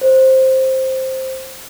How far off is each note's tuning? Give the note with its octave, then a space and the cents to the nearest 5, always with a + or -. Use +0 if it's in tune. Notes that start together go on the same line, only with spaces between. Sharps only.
C5 +5